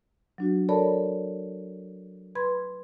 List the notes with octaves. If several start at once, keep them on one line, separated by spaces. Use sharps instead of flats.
F#3 D4 F#4
A4 A#4 C#5 D5 A5 B5
B4 B5 C6 G#6